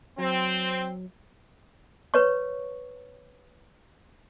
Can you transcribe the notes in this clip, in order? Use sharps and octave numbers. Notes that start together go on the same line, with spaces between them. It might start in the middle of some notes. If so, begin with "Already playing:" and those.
F#3 C4
B4 C#5 C#6